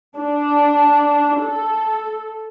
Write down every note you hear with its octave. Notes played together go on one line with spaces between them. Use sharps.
D4
A4